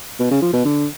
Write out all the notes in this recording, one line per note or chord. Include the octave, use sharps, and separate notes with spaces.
B2
C#3
F3
B2
D3